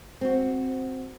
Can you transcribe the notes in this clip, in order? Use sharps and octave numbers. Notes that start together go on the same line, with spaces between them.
C4 F#4